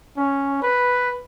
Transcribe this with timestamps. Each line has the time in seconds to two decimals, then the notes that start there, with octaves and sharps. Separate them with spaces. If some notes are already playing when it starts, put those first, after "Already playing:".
0.17 C#4
0.62 B4